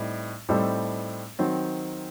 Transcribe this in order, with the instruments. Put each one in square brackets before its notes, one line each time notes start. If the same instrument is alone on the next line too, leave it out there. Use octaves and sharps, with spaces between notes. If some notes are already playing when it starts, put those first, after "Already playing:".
Already playing: [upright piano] A2 G3 C4 D#4
A2 G3 C4 D#4 A4
D#3 F#3 C4